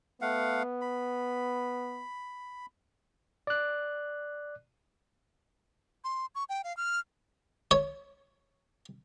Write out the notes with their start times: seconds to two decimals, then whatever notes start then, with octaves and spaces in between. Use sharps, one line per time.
0.22 A3 B3 F5 F#5
0.81 B5
3.47 D5 F#6
6.04 C6
6.35 C#6
6.49 G5
6.64 F5
6.77 F6
7.71 C#5